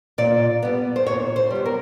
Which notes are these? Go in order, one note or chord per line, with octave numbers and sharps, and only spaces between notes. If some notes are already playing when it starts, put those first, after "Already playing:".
A#2 D5
G3 B3
C5
A#2 C#5
C5
G3 B3
A#4